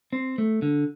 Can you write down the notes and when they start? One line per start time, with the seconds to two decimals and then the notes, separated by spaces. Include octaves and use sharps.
0.13 C4
0.38 A3
0.62 D3